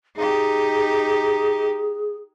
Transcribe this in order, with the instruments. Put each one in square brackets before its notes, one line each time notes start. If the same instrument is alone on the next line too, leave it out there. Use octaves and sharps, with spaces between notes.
[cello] D#4 G4 [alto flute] G#4